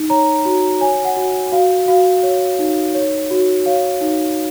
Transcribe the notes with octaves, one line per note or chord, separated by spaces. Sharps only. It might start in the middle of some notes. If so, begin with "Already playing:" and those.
Already playing: D#4
C#5 A#5
F#4
C#5 G#5
F#5
F#4
F#4 F5
F#4 F5
C#5
D#4
C#5
F#4
C#5 F5
D#4